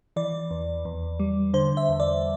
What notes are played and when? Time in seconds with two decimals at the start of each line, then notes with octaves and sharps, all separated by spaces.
0.16 E3 D5
0.51 E2
0.85 E2
1.20 G3
1.54 D3 C5
1.77 E5
1.89 E2
2.00 D5